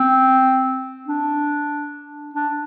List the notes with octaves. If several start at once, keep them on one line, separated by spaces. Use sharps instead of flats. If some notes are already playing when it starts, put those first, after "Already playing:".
Already playing: C4
D4
D4